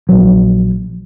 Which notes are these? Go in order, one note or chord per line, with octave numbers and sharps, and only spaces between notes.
A#1 F#3